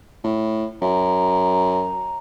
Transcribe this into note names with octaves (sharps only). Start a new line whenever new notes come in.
A2
F#2 A#5